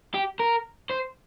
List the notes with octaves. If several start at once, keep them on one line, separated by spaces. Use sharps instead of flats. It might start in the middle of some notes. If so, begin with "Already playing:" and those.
G4
A#4
C5